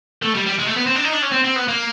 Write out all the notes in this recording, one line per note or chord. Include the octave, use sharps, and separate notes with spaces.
A3
G3
G3
G#3
A3
B3
C4
D4
D#4
D4
C#4
C4
C4
B3
A#3